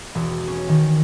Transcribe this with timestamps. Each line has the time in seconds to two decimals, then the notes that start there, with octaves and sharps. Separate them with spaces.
0.15 E1
0.48 C#4
0.69 D#3